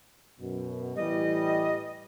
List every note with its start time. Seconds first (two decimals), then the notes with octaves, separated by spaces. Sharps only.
0.40 F#2 B2
0.96 A2 E3 G3 D#5